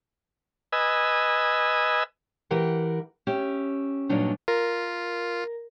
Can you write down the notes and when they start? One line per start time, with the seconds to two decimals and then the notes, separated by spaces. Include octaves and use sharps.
0.72 B4 D#5 G#5 E6
2.51 E3 G4 A#4 F#5
3.27 C#4 G4 E5
4.09 G2 A#2 F#3 D4 D#4
4.48 F4 A#4